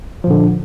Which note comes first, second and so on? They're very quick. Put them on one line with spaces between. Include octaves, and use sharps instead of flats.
F3 A#2 D3